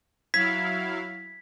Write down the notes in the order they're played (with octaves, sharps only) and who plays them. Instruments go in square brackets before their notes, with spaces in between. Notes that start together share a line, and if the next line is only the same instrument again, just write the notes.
[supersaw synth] F#3 E4 F5 [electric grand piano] G#6 [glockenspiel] B6